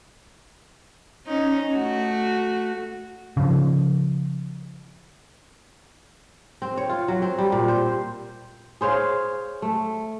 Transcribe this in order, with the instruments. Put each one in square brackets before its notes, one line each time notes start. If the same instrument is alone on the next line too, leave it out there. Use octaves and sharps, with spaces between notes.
[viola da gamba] C#4 D#4
A3 F#4
[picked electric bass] C#3 F3
[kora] C4
C#5
F4
F#3
C4
G3
A#2
C5
G#4 C5 C#5 F5
A3